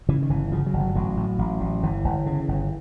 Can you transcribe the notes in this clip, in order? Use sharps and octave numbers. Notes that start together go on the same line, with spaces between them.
C#3 E3
D#3
G1 E3
C#3 F3
F#3
G1
F#3
A1 F#3
A2
A1
A1
G1 E3
G1
C#3
G1